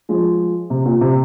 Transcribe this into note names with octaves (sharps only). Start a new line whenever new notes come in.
F3 G#3
C3
A#2
C3